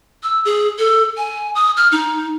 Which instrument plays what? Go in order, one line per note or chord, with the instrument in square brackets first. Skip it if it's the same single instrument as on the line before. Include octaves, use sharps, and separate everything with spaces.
[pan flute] E6
G#4
A4
G#5
D#6
F6
D#4